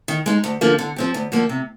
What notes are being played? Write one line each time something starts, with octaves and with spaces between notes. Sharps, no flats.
D#3
G#3 D#4
D2
D3 F3 A#3
D3
F3 C4 G4
D2
D3 F3 A#3
C3